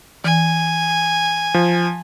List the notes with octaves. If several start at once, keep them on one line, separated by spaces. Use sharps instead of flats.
E3 G#5
F3